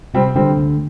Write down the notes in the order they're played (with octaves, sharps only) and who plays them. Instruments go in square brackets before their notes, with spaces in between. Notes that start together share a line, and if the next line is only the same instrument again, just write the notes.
[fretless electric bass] C3 [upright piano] G3 C4
[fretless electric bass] D3 [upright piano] G3 C4
[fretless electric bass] D2